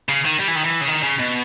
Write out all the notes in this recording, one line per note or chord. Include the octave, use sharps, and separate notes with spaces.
C#3
D#3
G3
E3
D#3
E3
C#3
D#3
C#3
B2